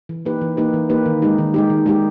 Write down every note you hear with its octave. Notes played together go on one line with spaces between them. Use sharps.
E3
A#3 D#4 G4 B4
E3
A#3 D#4 G4 B4
E3
A#3 D#4 G4 B4
D#3
G#3 D#4 G4
D#3
G#3 D#4 G4
D#3
G#3 D#4 G4